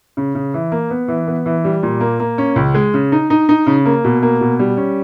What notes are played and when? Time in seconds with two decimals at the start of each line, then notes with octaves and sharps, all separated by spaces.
0.17 C#3
0.35 C#3
0.54 E3
0.72 A#3
0.90 B3
1.08 E3
1.27 B3
1.46 E3
1.64 G3
1.83 A#2
2.00 A#3
2.20 A#3
2.38 C#4
2.56 C#2
2.75 G#3
2.94 C#3
3.12 D#4
3.30 D#4
3.49 D#4
3.67 C#3
3.86 A#3
4.04 B2
4.22 A#3
4.41 B2
4.59 G3
4.77 C#4